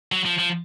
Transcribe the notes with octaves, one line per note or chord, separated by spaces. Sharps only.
F#3
F3
F3